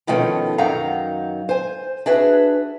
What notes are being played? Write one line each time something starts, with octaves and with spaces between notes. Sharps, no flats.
B2 D#3 F3 A3 C#4
F#2 D#3 F#3 D#4 F5 A#5
C5 G#5
D4 F#4 G#4 B4 E5